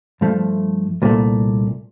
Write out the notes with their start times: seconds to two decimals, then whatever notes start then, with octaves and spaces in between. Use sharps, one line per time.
0.21 G2 F3 A3
1.02 C2 A#2 A3